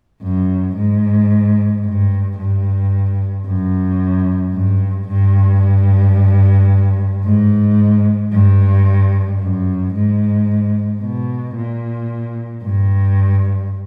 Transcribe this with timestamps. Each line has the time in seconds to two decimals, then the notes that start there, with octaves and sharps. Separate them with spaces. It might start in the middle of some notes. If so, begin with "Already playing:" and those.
0.23 F#2
0.76 G#2
1.84 G2
2.38 G2
3.46 F#2
4.54 G2
5.08 G2
7.24 G#2
8.32 G2
9.40 F#2
9.94 G#2
11.02 B2
11.55 A#2
12.63 G2